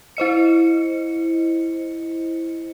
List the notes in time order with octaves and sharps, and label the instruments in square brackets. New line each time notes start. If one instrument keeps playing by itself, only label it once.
[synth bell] E4 C5 D#5 C#7